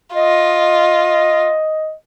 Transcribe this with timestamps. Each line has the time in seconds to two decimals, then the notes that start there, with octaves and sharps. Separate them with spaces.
0.15 F4 D#5